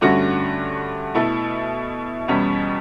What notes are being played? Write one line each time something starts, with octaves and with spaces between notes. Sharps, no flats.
G2 D3 A3 C#4 F#4
B2 A3 E4 A4
E2 B2 G3 C#4